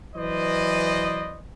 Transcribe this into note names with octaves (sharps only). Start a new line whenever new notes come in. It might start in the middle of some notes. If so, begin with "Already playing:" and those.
E3 F#3 B4 C5 D5 D#5